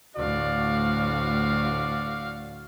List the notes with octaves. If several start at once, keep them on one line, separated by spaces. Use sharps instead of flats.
D2 A2 F#4 D5 F5